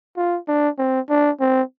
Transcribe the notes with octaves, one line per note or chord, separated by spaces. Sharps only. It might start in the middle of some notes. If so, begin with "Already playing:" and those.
F4
D4
C4
D4
C4